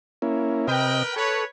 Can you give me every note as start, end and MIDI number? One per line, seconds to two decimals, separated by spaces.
0.22 0.67 58
0.22 0.67 61
0.22 0.67 64
0.68 1.03 48
0.68 1.14 70
0.68 1.14 71
0.68 1.03 75
0.68 1.14 79
1.16 1.45 69
1.16 1.44 71
1.16 1.44 73